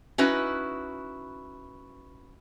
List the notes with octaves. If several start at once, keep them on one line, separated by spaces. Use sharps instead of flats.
C#4 D#4 E4 F#4 B4